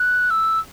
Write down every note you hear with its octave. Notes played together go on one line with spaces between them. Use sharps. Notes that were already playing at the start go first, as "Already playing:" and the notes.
Already playing: F#6
E6